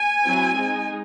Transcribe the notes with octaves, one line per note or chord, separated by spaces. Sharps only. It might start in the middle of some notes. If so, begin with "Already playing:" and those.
Already playing: G#5
F#3 C4 E4
G#3 D#4